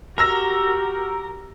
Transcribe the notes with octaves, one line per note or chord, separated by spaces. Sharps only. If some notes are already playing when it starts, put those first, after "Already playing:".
F#4 G4 A#4 A#5 E6 A#6